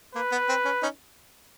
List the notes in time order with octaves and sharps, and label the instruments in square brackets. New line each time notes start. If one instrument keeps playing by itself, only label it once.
[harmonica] A#3 [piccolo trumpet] B4
[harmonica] B3
C4
C#4
C#4 D#4